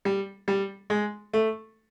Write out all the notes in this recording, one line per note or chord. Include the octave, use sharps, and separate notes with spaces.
G3
G3
G#3
A3